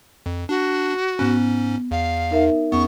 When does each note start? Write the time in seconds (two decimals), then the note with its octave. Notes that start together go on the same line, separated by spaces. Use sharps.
0.26 F2
0.49 D4 F#4
1.19 G#2 B3 C#4 F#6
1.91 E2 F5
2.31 D#4 A#4 E5
2.72 E2 B3 C#4 C#6